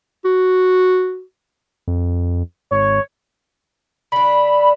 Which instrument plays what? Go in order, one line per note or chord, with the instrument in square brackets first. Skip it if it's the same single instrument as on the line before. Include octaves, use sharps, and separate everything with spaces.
[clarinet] F#4
[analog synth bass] F2
[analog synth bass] G#1 [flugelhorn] C#5
[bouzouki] D3 D4 [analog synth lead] B5